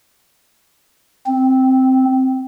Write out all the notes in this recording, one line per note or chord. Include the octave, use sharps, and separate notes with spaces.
C4